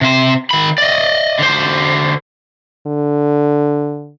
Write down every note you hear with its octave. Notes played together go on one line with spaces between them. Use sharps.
C3 C5
D#3 B5
D5 D#5
D3 C5
D3